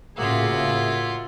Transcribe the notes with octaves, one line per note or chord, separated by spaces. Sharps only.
A2 C#3 A#3 F4 F#4 G#4 E5